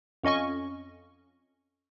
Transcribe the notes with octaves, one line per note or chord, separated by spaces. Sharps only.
F2 C#4 D#5 G#5 C#6